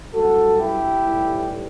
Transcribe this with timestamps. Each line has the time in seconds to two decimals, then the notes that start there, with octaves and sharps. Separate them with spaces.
0.14 A1 G2 F#3 F#4 A4
0.59 E4 G4
1.02 B1 A2 E3 G3